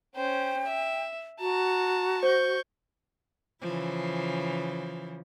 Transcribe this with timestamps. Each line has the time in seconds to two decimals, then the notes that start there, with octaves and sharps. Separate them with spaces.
0.16 C#4 C5 G5
0.67 E5
1.40 F#4 A5 A#5
2.23 C5 C#6 G6
3.62 C#3 E3 F3